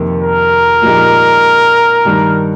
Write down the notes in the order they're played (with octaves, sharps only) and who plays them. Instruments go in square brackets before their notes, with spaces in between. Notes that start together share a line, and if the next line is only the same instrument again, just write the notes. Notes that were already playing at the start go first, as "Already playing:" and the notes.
Already playing: [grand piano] F2 C3 D#3 A#3
[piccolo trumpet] A#4
[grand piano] A#2 F3 G#3 D#4 G4
G2 D#3 G3